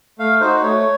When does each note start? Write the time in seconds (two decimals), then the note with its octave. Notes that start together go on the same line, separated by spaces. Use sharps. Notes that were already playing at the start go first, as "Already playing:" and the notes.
0.19 A3 F5
0.41 D#4 F#4 C5
0.62 A3 C#5